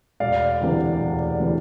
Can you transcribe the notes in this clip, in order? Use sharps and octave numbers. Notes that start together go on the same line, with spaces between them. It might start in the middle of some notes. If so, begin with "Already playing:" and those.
E1 D5 F5
D2 C3 E3
E1
C3 E3